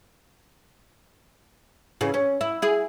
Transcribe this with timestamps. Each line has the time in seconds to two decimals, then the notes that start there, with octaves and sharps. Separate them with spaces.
2.01 C#3 E3
2.14 C#4
2.41 E4
2.62 E4 G#4